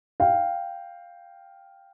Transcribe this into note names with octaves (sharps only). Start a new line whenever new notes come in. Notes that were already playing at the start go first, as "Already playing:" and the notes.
F5 G5